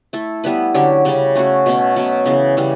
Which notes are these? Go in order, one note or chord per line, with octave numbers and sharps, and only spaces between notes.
A3 E4 A4
G3 B3 E4 B4
D3 F#3 C#4 G4
C#3 G3 C#4
A3 C#4 F#4
B2 A3 C#4
B2 F#3 C#4
C#3 E3 B3
C#3 E3 G3